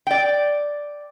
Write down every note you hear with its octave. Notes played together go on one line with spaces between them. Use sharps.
D5 G5